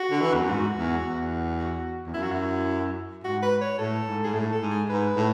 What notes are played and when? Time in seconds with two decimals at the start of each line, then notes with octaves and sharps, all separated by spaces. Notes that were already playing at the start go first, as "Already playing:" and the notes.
Already playing: F#4
0.11 D3
0.21 E3
0.34 E2
0.41 F#2
0.49 G#2 F#4
0.77 E2
1.04 E2
1.59 F#4
2.07 E2
2.14 F#2 E4
2.22 F#4
2.31 E4
3.24 G#2 F#4
3.42 B4
3.61 C#5
3.79 A2 A4
4.07 G#2
4.23 G#2 G#4
4.34 A2 A4
4.52 A4
4.62 G#2
4.71 G#4
4.89 G#2 B4
5.17 A2